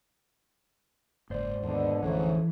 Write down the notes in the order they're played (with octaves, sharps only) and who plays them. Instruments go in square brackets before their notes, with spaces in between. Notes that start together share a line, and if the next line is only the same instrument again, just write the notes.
[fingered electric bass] F#1 [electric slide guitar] G#2 C5 D5
[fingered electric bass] D#2 [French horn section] B2 D3
[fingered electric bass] A1 F2 D3 [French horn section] G#2 A3 C#4 [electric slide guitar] E3